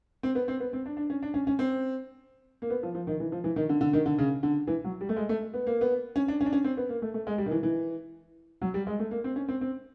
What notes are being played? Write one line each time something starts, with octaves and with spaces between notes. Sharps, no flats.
C4
B3
C4
B3
C4
D4
D4
C#4
D4
C#4
C#4
C4
A#3
B3
F3
F3
D#3
E3
F3
E3
D#3
D3
D3
D#3
D3
C#3
D3
E3
F#3
G3
A3
G#3
A3
B3
A#3
B3
C#4
D4
C#4
D4
C#4
C4
B3
A#3
A3
A3
G#3
G3
D#3
E3
E3
F#3
G3
G#3
A3
A#3
C4
C#4
C4
C4